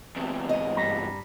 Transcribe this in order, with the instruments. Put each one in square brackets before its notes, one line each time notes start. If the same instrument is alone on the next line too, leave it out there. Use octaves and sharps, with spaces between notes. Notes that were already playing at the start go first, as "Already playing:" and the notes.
[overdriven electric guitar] E2 C3
[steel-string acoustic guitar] G#2 D#5
[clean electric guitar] G2 G3 A#5